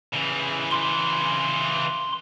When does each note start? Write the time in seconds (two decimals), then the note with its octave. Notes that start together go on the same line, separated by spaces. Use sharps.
0.13 C#3 E3
0.71 C6